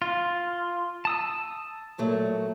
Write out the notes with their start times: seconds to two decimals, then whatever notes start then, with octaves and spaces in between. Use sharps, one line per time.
0.02 F4
1.05 A5 D#6 E6
1.98 A#2 F#3 A3